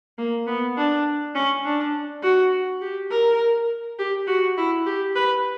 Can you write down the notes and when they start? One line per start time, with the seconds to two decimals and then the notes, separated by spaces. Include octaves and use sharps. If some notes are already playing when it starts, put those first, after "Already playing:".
0.18 A#3
0.47 B3
0.77 D4
1.35 C#4
1.65 D4
2.23 F#4
2.81 G4
3.10 A#4
3.99 G4
4.27 F#4
4.57 E4
4.86 G4
5.16 B4